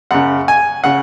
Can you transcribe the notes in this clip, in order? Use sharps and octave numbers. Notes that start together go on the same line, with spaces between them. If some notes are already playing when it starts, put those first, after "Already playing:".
F#2 C#3 F#5
G#5
C#3 F#5